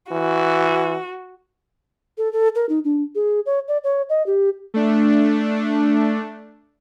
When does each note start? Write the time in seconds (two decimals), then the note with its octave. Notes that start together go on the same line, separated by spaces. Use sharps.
0.11 E3 F#4
2.18 A4
2.33 A4
2.55 A#4
2.69 D#4
2.84 D4
3.15 G#4
3.46 C#5
3.68 D5
3.84 C#5
4.09 D#5
4.26 G4
4.74 A3 D4